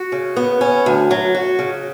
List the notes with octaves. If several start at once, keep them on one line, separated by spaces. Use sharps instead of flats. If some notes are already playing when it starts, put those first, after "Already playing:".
Already playing: F#4
C#3
B3
C#4
D2
F#3
F#4
C#3